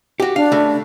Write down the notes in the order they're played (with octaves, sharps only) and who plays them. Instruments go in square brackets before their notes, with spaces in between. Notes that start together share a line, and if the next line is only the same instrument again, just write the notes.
[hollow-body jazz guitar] F#4 G4
[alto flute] D4 [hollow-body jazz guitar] F5
[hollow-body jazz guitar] C#3 A3